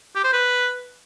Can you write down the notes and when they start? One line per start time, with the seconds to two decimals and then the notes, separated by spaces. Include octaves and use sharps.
0.15 G4
0.24 C5
0.33 B4